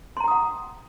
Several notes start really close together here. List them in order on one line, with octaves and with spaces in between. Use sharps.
C6 A#5 G5 D#6 F#5